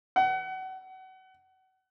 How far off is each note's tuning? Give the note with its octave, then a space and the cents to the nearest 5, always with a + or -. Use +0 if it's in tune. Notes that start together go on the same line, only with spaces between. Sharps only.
F#5 +30